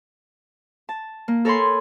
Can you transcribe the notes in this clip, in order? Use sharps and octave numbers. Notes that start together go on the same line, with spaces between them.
A5
A#3
A4 A#4 C#5 G#5 B5 C6